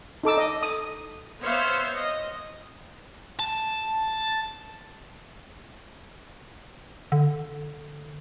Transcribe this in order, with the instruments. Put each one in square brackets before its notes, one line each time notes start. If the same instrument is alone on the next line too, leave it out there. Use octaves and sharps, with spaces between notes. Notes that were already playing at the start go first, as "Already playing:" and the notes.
[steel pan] D#4 A4 D6 E6
D#5
D#6
[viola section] B3 C5 C#5 E5 F5
D#5
[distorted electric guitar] A5
[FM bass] D3